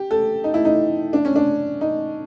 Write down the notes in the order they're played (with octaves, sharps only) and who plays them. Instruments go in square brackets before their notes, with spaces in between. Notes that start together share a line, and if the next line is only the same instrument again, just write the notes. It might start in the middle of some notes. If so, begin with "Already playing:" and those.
Already playing: [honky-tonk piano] G4
A4
D#4
E4
D#4
D4
C#4
D4
D#4